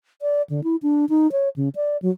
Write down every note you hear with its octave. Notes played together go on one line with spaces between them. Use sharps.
D5
D3
E4
D4
D#4
C#5
C#3
D5
F#3